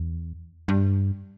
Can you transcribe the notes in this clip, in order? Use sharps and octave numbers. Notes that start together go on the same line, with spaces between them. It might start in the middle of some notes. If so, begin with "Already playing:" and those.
Already playing: E2
G2